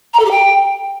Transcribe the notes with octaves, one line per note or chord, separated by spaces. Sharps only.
A#5
A4
G4
G5